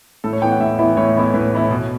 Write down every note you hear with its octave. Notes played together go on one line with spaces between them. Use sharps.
A2 A4
C#5
E3 B3 E4 G5
F#5
A2 E5
E3 B3 E4
A2 C#5
E3 B3 E4
A2 B4
E3 B3 E4
B2